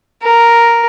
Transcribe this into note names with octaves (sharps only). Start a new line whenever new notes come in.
A#4